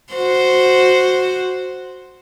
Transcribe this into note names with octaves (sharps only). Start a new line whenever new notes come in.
F#4 C5